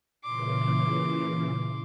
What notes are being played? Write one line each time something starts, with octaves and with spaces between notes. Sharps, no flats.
A#2 C#3 E3 C6 D6